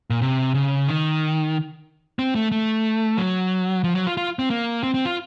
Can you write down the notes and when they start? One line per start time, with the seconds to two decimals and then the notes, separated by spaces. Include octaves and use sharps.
0.10 A#2
0.22 C3
0.54 C#3
0.88 D#3
2.19 C4
2.35 A3
2.52 A3
3.17 F#3
3.84 F3
3.95 F#3
4.07 F4
4.17 F4
4.39 C4
4.50 A#3
4.83 C4
4.94 C4
5.05 F4